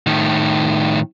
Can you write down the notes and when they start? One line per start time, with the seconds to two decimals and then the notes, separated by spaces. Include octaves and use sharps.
0.07 A2 D#3